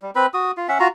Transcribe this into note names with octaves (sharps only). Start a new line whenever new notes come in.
G3
C4 B4 B5
F#4 D#6
F4
C#4 E5 F#5
F4 F#4 A#5